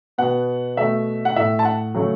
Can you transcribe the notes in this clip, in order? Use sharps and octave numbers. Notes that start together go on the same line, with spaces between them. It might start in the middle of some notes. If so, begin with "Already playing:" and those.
B2 B3 F#5
B2 A3 E5
F#5
A2 A3 E5
A5
F#5
C#3 F#3 A3